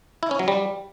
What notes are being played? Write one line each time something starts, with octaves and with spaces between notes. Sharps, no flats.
E4
C#4
F#3
G3